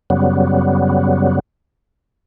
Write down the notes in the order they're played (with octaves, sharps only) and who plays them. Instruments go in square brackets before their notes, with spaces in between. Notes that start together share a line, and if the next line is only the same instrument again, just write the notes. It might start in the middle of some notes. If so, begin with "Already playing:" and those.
[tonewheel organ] F#2 C#3 F#3 G3 B3